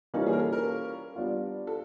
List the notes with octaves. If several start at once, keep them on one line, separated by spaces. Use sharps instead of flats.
E3 G3 A#3 C#4 D#4 F4
G#4
A#4
A4
A#4
G3 B3 D4 F4
A4